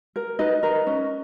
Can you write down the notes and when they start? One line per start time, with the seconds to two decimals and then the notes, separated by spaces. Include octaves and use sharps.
0.16 A#4
0.39 D#4 B4 D#5
0.63 A#4
0.87 C#4